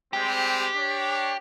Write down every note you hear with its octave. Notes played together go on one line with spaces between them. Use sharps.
G3 G#3 C4 G4
D4 C#5